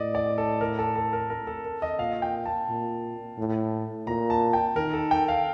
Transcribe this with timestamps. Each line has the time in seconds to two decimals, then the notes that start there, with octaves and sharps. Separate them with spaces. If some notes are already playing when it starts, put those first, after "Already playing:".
Already playing: A2 D5 D#5
0.15 D5
0.38 A4
0.61 A#4
0.78 A4
0.96 A4
1.13 A#4
1.30 A#4
1.47 A4
1.65 A#4
1.82 D#5
1.99 A#2 F5
2.22 G5
2.46 A5
2.69 A#2
3.38 A2
4.07 A#2 A#5
4.30 A5
4.53 G5
4.76 D#3 A#4
4.93 A4
5.11 G5
5.28 F5